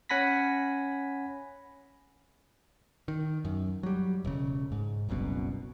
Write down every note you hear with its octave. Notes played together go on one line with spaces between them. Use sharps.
C#4 F#5 G#5 B5 A#6 B6
D#3
F#2
F#3 G3
E1 C#3
G#2
F#1 C2 F#2 B2